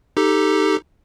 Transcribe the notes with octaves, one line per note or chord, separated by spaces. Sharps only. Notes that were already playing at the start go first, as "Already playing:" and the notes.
D#4 G4 A4